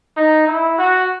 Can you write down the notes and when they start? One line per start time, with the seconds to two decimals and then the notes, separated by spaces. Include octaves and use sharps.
0.17 D#4
0.47 E4
0.78 F#4